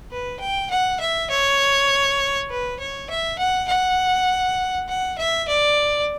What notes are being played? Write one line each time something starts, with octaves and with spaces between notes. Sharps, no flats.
B4
G5
F#5
E5
C#5
B4
C#5
E5
F#5
F#5
F#5
E5
D5